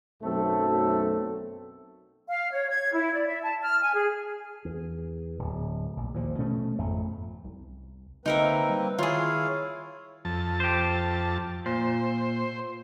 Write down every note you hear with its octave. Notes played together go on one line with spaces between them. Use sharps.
B1 F#2 A3 C4 A4
F5
C#5
G#6
E4
D5
E5
A5
F6
G#5
G#4
E2
D1
A#1
D#2 A#2 F3
B2 A3 C#4
G#1 F2 F3 A3
C2
D3 A#3 C4 D#4 A#4 B4 E5
G3
D#3 E4 F4 G#4 C#5 F5
F2 A5
G4 C5
A#2 C5